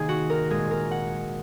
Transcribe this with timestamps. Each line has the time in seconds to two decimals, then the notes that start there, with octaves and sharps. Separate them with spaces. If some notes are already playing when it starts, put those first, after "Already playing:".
Already playing: C3 D#3 A#3 G#4
0.09 F#4
0.30 A#4
0.50 A#2 G#3 G#4
0.71 A#4
0.91 F#5